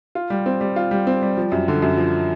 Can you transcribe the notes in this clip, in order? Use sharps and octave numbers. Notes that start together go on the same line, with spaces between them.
F4
G3
C4
G3
F4
G3
C4
G3
F3
F#2
D3
F#2
F3